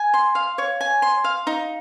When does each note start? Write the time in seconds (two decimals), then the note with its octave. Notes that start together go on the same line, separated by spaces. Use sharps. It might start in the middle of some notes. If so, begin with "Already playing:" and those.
Already playing: G#5
0.14 C6
0.35 F5
0.58 C#5
0.81 G#5
1.02 C6
1.24 F5
1.47 D#4